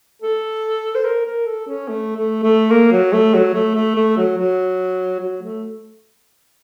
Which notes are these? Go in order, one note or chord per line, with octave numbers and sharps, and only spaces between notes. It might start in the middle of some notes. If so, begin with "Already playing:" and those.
A4
C5
A#4
A#4
A4
C#4
A3
A3
A3
A#3
F#3
A3
F#3
A3
A3
A3
F#3
F#3
F#3
A3